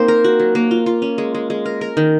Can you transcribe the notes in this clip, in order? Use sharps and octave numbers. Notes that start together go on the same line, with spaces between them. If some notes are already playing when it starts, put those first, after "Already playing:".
Already playing: A#3 C4 D#4 C5
A#4
F#4
F#3
A#3
F4
F4
C#4
G#3
G#3
G#3
A#4
A#4
D#3